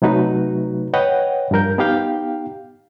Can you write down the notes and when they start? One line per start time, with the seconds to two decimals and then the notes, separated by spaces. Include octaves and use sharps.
0.02 C3 F#3 A3 D#4 F#4 B4
0.94 B4 C#5 D#5 F#5 G5
1.51 G2 F3 A#4 G6
1.78 B3 D#4 G4 F5 G5